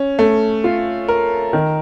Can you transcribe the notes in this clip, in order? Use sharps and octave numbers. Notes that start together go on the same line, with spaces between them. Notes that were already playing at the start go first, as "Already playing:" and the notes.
Already playing: C#4
A3
F4
A#4
D#3